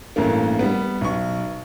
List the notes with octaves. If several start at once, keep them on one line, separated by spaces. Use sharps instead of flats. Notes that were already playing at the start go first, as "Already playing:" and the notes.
A1 G2 A3 A#3
G3 B3
B1 C#6